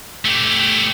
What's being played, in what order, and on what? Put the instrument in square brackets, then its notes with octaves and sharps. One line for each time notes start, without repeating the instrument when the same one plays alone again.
[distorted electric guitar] A3 G4